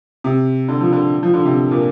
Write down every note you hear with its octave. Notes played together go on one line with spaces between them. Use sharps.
C3
D3
F3
D3
F3
D3
C3
A#2